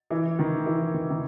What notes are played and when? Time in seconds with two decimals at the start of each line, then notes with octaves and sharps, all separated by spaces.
0.10 E3
0.39 D#3
0.66 E3
0.94 D#3
1.10 D#3